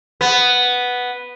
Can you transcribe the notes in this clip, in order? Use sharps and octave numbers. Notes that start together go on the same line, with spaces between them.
B3